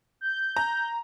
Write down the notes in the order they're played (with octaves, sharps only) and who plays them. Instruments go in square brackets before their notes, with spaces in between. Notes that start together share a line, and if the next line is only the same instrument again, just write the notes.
[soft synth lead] G6
[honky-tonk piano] A#5